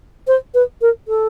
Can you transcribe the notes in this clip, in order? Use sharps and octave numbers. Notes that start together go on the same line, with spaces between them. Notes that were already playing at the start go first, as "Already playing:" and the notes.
C5
B4
A#4
A4